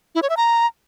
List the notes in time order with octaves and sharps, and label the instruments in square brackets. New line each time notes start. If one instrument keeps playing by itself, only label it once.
[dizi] E4
C#5
E5
A#5